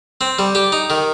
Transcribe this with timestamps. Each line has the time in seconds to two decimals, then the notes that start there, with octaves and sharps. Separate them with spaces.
0.21 C4
0.39 G3
0.55 G4
0.72 D#4
0.90 D#3